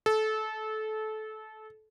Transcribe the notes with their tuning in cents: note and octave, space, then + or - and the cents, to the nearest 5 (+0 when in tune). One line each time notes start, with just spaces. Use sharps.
A4 -20